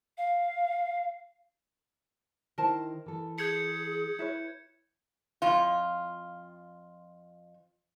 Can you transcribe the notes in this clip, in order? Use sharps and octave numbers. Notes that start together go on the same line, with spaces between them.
F5
D#3 E4 A#4 C5 A5
E3 A4
G#4 G6 G#6 C#7
E4 B4 C#5
F2 F4